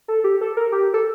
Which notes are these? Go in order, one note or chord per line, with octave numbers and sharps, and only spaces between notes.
A4
G4
A4
A#4
G4
A4